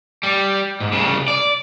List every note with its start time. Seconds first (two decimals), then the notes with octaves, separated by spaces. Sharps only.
0.23 G3
0.81 G#2
0.92 C2 C#3
1.28 D5